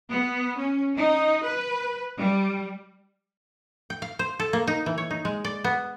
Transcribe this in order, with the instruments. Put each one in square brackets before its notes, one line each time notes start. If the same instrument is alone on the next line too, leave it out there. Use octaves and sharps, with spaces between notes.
[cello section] B3
C#4
D#4
B4
G3
[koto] G5
F5
C5
A4
A#3
D#4
E3
C#5
D#4
G#3
D5
B3